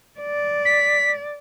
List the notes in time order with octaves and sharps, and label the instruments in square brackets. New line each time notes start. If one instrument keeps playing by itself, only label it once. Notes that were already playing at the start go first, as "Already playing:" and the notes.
[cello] D5
[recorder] B6